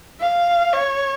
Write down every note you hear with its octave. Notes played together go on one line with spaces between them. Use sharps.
F5
C#5